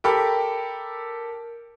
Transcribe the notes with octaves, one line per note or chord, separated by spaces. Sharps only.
G4 A4 A#4 B5 D6